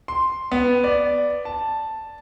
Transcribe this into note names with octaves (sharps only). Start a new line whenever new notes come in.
C6
B3
D5
A5